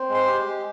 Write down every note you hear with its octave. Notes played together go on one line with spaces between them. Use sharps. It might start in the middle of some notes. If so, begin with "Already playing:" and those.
Already playing: C4
G#3
C5 C6
G4
G#3